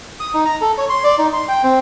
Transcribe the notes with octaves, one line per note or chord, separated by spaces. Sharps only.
D#6
D#4
A#5
A4
C#5
C6
D5
D#4
C6
G5
C4